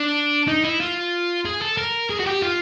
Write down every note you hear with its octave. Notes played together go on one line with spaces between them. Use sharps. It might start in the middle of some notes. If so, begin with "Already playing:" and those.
Already playing: D4
D#4
E4
F4
G#4
A4
A#4
G#4
F#4
G4
F4